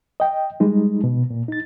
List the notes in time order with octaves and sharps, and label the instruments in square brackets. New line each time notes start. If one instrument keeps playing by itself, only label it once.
[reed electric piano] D#5 G5
G3 G#3 D#4
B2
A#2
D#4 A6